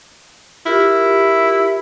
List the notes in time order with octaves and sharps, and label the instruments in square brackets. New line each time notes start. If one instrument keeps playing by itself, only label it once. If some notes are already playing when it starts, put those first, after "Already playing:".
[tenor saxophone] E4 [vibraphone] F4 G4 A#4